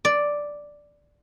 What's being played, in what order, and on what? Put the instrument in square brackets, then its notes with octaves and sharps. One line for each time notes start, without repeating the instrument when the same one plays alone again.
[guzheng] D5